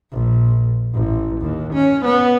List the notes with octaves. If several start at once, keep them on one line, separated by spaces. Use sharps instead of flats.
A#1
A1
D#2
C#4
B3